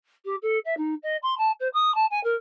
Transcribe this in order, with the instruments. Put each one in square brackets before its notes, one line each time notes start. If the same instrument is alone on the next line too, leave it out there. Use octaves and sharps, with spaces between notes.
[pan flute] G4
A4
E5
D#4
D#5
C6
A5
C5
D#6
A5
G#5
A#4